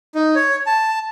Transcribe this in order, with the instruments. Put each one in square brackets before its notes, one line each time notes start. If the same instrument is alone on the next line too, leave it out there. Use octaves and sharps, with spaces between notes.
[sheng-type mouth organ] D#4
C#5
A5